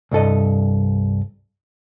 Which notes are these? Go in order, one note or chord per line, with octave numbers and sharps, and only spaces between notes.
C2 G2 A4 D#5